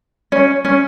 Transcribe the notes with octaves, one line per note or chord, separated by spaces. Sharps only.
C#4
C#4